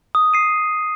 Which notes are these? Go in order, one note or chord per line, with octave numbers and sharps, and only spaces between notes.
D#6
C7 D#7